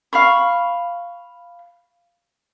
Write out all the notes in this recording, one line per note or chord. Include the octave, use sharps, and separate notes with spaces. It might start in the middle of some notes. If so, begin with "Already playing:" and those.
F5 B5 C#6